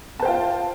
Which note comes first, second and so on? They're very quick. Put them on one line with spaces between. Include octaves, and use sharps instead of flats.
A5 C5 G5 F4